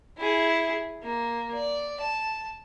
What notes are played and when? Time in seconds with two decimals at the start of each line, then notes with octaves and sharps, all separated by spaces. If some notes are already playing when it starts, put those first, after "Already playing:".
0.18 E4 G#4
1.02 A#3
1.54 D5
2.01 A5